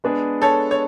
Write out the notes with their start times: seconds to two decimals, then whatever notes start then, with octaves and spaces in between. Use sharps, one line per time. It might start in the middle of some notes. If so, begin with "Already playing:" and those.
0.04 G#3 B3 D4 G#4
0.42 A4 C#5
0.71 C#5